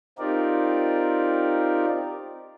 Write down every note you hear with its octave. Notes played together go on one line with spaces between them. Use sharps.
C4 D#4 F4 G4 A#4 D5